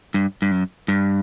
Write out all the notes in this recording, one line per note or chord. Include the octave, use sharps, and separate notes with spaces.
G2
G2
F#2
G2